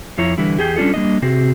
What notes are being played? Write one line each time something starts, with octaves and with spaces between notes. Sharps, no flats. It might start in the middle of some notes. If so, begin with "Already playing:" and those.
F2 F3 E4 C#5 A#5
D3 E3 G3 E4
E2 G4 G#4 G5
G3 C#4 D4 F4 A4
G3 A#3 D4 D#5
C3 C4 F#4 G#4